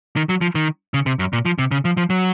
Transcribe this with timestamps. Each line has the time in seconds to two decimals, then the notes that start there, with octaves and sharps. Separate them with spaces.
0.16 D#3
0.29 F#3
0.41 F3
0.55 D#3
0.94 C#3
1.06 C3
1.19 F#2
1.33 A#2
1.45 F3
1.59 C3
1.71 C#3
1.85 F3
1.97 F3
2.10 F#3